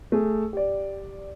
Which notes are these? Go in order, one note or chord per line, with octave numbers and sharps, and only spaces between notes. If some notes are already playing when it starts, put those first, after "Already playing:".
A3 G#4
G4 D5